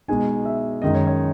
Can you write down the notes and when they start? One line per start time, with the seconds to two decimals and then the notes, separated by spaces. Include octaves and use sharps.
0.08 B2 G#3 D#4 G#5
0.45 E5
0.82 F#2 D#3 G#3 D#4 D#5
0.94 C#5
1.07 C#5